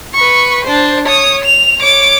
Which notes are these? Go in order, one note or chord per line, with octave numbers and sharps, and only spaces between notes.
B4 C#6
D4 C5
C#5 D#6
F7
C#5 D6